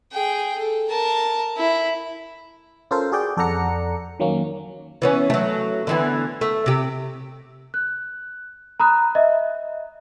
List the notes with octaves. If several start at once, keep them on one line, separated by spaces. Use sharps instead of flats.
G#4 G5
A4
A#4 A5
E4
C#4 F4 A4 A#4 C5
F#4 G#4 D5 G5
F2 A4 D5 F#5 A#5 C#7
D#3 F#3 A#3 C#4
E3 B3 C#4
F#3 A3
D3 E3 B3
A3
C3 G4
F#6
A#5 B5 D#6 F#6
D#5 E5